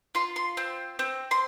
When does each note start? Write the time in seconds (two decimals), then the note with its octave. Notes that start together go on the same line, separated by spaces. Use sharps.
0.15 F4 C6
0.36 C6
0.57 C4
0.99 C4
1.31 C6